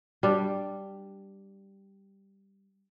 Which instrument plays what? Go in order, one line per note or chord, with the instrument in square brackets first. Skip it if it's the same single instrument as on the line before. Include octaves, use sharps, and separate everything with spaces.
[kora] G3 D4